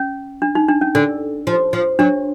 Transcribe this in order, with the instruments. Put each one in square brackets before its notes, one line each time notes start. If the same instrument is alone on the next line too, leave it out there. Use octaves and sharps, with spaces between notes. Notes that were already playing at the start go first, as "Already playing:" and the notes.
Already playing: [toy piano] C#4
D4
D#4
D4
C#4
[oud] D3 [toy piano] D4
[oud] F3
F3
[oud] F#3 [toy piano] D4